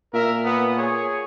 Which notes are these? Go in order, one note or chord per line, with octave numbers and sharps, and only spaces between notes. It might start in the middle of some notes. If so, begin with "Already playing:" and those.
A#2 A#4 E5
B3
G#4 C#5